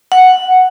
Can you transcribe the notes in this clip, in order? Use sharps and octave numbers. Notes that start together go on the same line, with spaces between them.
F#5